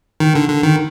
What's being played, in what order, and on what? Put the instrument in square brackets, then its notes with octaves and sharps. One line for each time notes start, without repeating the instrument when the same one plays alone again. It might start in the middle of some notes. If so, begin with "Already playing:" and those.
[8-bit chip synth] D#3
D3
D3
D#3